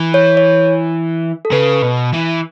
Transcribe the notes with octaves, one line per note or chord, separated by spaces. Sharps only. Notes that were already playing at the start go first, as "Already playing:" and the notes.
Already playing: E3
C#5
C#5
A4
C#3 B4
B2
E3